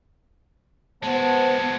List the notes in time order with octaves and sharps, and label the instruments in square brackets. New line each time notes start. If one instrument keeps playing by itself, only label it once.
[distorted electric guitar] G#3 F#4 [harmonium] B3 [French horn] C5 [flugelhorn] A5